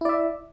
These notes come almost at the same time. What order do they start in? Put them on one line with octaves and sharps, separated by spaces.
E4 D5 E5